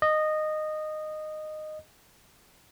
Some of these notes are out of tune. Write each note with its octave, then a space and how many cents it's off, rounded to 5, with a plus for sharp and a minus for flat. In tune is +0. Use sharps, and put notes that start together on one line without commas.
D#5 -15